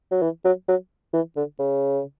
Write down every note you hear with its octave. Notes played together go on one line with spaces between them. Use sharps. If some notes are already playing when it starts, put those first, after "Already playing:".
F#3
E3
F#3
F#3
E3
D3
C#3